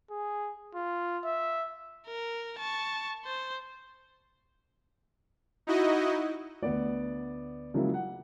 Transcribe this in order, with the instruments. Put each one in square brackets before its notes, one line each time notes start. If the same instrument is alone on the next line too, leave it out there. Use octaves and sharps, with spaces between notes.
[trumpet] G#4
F4
E5
[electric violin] A#4
A5 C#6
C5
[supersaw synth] D#4 E4 F#4 D#5
[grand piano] D2 B3 D5
C#3 F3 F#3 G#3 A#3 E4
F#5